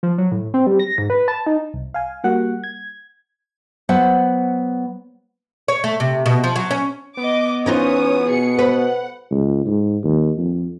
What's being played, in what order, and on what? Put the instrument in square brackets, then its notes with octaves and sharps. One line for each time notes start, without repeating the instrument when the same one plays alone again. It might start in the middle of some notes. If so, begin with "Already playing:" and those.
[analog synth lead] F3
F#3
A2
C4
G3
A#6
G#2
B4
A5
D#4
[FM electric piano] C2
F5 G#5
G3 A#3 F#4 F#5
G#6
[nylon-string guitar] F#3 B3 C5 F#5
[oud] C#5
A3
C3
B2
F3
F#3
C#4
[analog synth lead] B3 [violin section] D#5 D6
[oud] E3 D#4 F4 [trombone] C#4 [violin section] C#5 D#6
[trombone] B2 [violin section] G#4 C#7
[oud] B4 [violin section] F#5
[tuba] C#2
G#2
D#2
F2